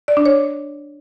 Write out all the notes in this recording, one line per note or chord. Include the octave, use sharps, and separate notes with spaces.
D5
D4
C#5